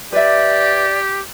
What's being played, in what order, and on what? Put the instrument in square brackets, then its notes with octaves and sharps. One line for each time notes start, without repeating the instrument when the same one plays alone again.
[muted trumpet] G4 [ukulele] B4 E5 [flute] D5